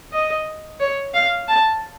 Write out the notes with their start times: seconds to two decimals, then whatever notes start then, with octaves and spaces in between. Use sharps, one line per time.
0.13 D#5
0.80 C#5
1.14 F5
1.48 A5